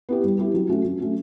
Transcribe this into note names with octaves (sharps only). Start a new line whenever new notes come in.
B3 E4 G4
G3
B3 E4 G4
F#3
A3 C#4 F#4
F#3
A3 C#4 F#4